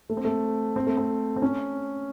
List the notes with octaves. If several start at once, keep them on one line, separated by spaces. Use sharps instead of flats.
A3
C4
A3
C4
A3
C4
C4
C#4